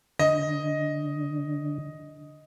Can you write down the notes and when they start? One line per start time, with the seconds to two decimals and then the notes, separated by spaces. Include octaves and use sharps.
0.19 D3 D#5